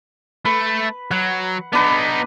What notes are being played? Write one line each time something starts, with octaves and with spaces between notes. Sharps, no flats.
A3 B4
F#3 F#5
B3 D4 D#4 B4